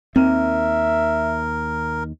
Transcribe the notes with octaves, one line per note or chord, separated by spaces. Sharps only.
D#2 D#3 C4 A#4 E5